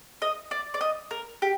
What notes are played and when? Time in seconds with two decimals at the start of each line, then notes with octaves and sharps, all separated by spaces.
0.22 D#5
0.51 D5
0.74 D5
0.81 D#5
1.11 A#4
1.42 G4